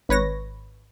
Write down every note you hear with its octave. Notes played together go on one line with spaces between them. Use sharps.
G#1 B4 C#5 A#6